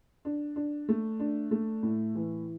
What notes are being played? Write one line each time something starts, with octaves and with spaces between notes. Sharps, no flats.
D4
D4
A3
D4
A3
A2
E3